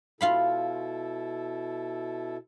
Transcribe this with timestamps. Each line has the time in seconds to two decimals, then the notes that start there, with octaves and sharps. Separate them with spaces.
0.21 B2 E4 F4 A4 F5 B5